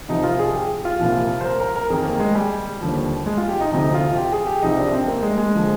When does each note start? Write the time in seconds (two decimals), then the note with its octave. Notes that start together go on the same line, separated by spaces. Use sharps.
0.08 C2 C3 F3 D#4
0.23 F4
0.39 G#4
0.54 G4
0.85 F4
0.99 C2 A#2 F3
1.41 C5
1.45 A#4
1.60 A#4
1.76 A#4
1.90 F2 D#3 G#4
2.06 A#3
2.20 G#3
2.35 G3
2.81 D#2 D3 F3
3.26 G#3
3.38 F4
3.49 G4
3.60 D#4
3.71 D2 C3 F3 D#4
3.94 F4
4.16 G4
4.32 G#4
4.47 G4
4.62 C2 C3 F3 D#4
4.77 D4
4.93 C4
5.08 A#3
5.23 G#3
5.38 G#3
5.54 D3 F3